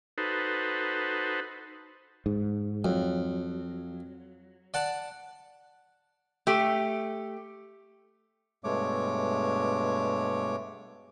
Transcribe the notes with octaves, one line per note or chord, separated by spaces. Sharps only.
D#4 F#4 A4 B4 C5
G#2
F2 F#3
D5 F#5 A5
A3 G4
G2 B2 G#3 A3 C#5 D6